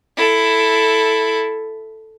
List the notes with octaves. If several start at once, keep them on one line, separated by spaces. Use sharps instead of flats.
E4 A4